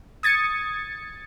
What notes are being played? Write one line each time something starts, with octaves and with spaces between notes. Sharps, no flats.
D#6 G#6 A6 C#7